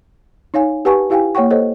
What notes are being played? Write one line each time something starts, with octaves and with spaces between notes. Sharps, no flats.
D#4 C#5 F5 G#5
G4 B4 F#5 G#5 A5 C#6
E4 G4 F5 G5 G#5
A#3 C#5 F#5 G5 C#6
A4 C5 C#5 D#5